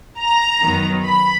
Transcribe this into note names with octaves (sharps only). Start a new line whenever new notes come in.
A#5
F#2 D#3 F#3 B3
B5